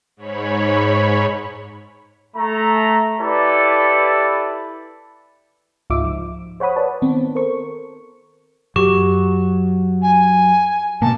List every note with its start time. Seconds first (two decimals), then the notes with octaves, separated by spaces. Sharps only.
0.17 G#2 C#5 B5
2.36 A3 A#5
3.20 E4 G4 A4 B4 D5
5.90 C#2 G#2 D#4 F4 E5 D6
6.04 F3
6.60 C5 C#5 F#5 B5 D#6
6.76 B4 C#5 D5 A5
7.02 D#3 B3 C4
7.35 A4 A#4 C5 C#6
8.76 F#2 F#3 G4 C#6
10.02 G#5
11.02 G#2 B2 A#3 A5